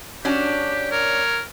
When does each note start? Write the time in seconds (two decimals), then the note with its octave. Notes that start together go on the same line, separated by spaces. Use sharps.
0.25 C#4 D4 F#4 G4
0.92 A#4 C#5